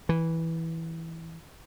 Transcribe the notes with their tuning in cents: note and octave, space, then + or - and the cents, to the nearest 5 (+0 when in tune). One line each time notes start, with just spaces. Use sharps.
E3 -10